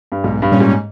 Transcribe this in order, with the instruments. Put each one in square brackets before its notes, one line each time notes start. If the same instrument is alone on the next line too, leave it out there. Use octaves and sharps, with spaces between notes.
[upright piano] G2
[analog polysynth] B1 [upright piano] G#2
[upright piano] G2
[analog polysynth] A#2 G3 C#4
[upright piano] G#2